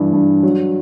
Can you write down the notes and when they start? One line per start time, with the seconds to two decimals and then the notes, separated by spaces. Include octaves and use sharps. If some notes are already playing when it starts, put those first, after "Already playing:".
Already playing: G2 E3
0.12 G2
0.43 F#3